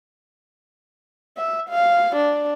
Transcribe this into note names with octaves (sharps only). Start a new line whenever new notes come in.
E5
F5
D4